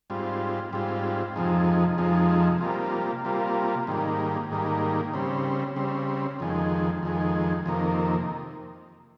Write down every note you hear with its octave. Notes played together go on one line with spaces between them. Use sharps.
G#2 G3 C4 F4
G#2 G3 C4 F4
F2 C3 F3 G#3 D#4
F2 C3 F3 G#3 D#4
C3 G3 A#3 F4
C3 G3 A#3 F4
G#2 D#3 G3 A#3
G#2 D#3 G3 A#3
C#3 G3 C4
C#3 G3 C4
F2 D#3 G#3
F2 D#3 G#3
F2 C3 D#3 A#3